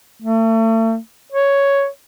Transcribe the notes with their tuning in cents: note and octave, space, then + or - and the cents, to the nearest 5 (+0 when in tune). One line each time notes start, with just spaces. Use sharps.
A3 +35
C#5 +5